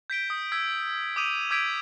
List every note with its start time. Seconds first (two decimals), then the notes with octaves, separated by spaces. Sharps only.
0.10 G6 B6 D7 G7
0.30 D#6
0.52 E6 G#6 B6
1.16 D6 D#6 G6 D#7 F7
1.51 D6 E6 G6 G#6 B6 D7